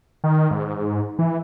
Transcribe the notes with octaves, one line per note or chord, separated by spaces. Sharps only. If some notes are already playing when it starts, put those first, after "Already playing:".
D#3
G#2
E3